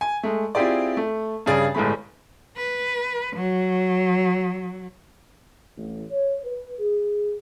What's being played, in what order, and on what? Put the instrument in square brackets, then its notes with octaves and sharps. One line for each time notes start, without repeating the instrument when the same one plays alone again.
[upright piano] G#5
G#3 A3
C4 E4 F4 G4 G#4 D5
A3
G2 C#3 G#4 D5 A6
G1 A2 G#3 A3 B5
[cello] B4
F#3
[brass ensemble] A1
C#5
B4
G#4